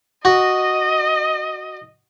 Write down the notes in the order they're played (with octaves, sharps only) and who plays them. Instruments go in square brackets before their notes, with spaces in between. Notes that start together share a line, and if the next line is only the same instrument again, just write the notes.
[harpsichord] F#4 [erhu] D#5